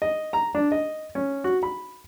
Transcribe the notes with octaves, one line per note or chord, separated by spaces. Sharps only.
D#5
A#5
D4
D#5
C#4
F#4
B5